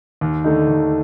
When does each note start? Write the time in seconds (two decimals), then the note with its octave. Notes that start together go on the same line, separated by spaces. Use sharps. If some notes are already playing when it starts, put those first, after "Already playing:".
0.21 D#2
0.44 D3 A3 D#4
0.68 D#2